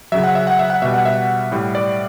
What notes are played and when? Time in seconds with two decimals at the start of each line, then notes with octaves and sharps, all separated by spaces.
0.12 C#3 F#3 E5
0.24 F#5
0.35 E5
0.47 F#5
0.59 E5
0.70 F#5
0.82 B2 G3 E5
0.94 F#5
1.05 E5
1.52 A2 G3
1.75 D5